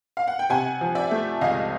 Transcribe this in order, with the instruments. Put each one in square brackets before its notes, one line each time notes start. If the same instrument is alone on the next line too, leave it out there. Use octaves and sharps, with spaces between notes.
[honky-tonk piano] F5
F#5
G5
C3 F#5 G#5
F3
D5 E5
A3
C#2 D#5 F5